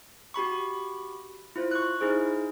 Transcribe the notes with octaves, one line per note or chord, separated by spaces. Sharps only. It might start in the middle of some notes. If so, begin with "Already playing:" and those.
F#4 G4 B5 C#6
E4 F4 C5
C#6 F#6
D#4 E4 G#4 C5